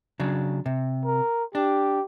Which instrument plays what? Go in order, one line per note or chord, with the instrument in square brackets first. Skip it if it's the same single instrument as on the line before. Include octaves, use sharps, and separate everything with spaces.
[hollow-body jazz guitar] C#3 F#3 D4
C3
[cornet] A#4
[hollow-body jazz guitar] D4 [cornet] G4